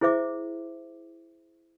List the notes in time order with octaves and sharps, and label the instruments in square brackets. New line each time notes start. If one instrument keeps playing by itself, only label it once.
[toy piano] E4 G#4 C5 E5 D6